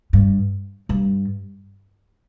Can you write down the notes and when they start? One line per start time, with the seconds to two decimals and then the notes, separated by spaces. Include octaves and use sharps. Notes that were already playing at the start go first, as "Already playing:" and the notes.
0.13 G2
0.89 G2